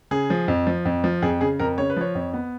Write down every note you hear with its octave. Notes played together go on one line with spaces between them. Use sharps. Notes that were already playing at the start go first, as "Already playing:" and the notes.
C#3 G#4
F3
F2
F3
F2
F3
F2 G#4
C#3 G#4
F2 A#4
C#3 C#5
B4
F3 C#5
F2
B3